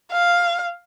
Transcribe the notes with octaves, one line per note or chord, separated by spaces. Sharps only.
F5